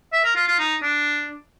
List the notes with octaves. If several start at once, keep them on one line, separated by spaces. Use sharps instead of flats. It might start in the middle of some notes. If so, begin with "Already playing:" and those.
E5
A#4
F4
F4
D#4
D4